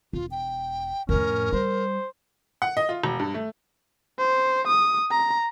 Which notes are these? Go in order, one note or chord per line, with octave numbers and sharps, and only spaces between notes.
E1 F4
G5
F2 A2 C#4 A#4
G3 C5
F#5
D#5
F4
E1
G2
A3
C5
D#6
A#5